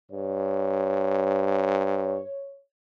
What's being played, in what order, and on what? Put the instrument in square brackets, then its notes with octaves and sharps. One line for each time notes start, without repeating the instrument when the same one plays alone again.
[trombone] G2 [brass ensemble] C#5